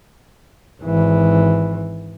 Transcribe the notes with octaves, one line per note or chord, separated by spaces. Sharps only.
G#1 E3